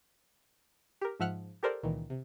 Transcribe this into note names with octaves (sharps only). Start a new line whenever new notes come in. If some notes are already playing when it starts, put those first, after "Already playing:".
G4 A#4
G#2 F3 E5 F#5 F6 F#6
G4 A4 A#4 C5 D5
C#2 A#2 D#3 E3
C3